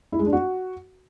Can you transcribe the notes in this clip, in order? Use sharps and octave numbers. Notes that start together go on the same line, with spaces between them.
E4
G#3
D4
F#4